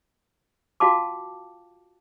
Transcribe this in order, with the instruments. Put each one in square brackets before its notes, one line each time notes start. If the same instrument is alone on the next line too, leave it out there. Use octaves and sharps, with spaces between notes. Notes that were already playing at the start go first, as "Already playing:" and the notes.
[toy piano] F4 F#4 F5 G5 A5 D6